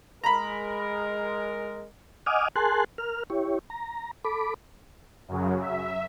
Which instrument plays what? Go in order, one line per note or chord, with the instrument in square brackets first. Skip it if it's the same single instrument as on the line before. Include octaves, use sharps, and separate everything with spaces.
[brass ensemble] G#3 A#4 [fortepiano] A#5 B5
[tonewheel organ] D#5 F#5 G#5 D6 D#6 F6
G#4 A#4 G#5 A5 C6 F#6
A#4 F6
E4 G4 C#5
A#5
A4 B5 D6
[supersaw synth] F#2 C#3 F#3
E5